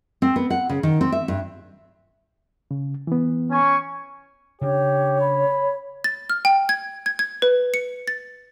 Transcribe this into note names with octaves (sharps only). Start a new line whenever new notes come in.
C4
B3
F#5
C#3
D#3
C4
E5
G2
C#3
E3 B3
C#4 G#5 C#6
C#3 D4 G4 C#5
B5
A6
F6
G5
G#6
G#6
G#6
B4
C#7
A6